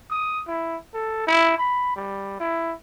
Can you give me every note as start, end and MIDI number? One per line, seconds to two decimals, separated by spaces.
0.10 0.42 87
0.47 0.76 64
0.94 1.25 69
1.27 1.55 64
1.58 1.92 83
1.96 2.38 55
2.40 2.74 64